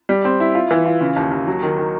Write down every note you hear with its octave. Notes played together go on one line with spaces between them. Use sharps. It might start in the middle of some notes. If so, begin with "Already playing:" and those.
G3
C4
E4
F4
E3
F4
C#3
D#2
D#2
F#3
D#3
D#3